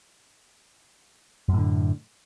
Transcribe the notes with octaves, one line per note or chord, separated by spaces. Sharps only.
F#2 A2 D3